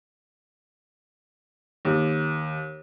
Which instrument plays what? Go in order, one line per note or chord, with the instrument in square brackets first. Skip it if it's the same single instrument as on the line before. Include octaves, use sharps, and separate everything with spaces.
[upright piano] D#2